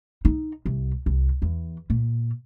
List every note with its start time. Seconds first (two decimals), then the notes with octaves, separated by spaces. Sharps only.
0.25 D#4
0.66 C2
1.06 C2
1.42 E2
1.90 A#2